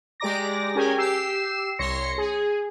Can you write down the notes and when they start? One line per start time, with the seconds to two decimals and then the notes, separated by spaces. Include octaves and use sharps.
0.20 G#3 G4 D5 A#5 D6 A#6
0.75 C#4 G4 G#4 A#4 G5 G#5
0.98 G4 E6 C7 E7
1.79 C2 C#5 C6 A#6 C#7
2.18 G#4